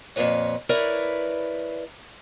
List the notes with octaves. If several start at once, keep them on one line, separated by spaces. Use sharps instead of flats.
F2 A#2 E3 G#3 B4 C#5
E4 A#4 B4 C#5 D5 E5